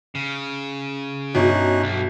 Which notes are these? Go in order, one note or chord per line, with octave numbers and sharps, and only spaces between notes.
C#3
G1 B2 C#4 D#4 F#6
B1